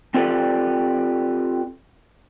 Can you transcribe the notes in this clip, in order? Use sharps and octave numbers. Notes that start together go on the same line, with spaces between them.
C4 F4 G4 A4 B4 D5